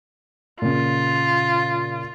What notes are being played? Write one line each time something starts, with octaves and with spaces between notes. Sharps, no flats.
A#2 C#3 F4